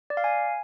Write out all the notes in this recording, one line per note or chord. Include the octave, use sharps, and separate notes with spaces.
D5
F5
G#5